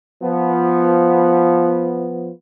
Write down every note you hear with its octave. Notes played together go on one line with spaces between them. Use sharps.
F3 B3